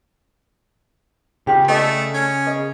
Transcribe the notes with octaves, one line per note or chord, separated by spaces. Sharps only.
C#3 F4 G4
A3 D5 D#5
C#4
D#5